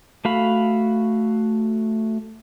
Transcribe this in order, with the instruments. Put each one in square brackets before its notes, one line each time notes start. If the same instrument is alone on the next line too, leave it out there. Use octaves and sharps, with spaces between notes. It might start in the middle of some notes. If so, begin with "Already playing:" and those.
[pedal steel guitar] A3 F#4 F5 B5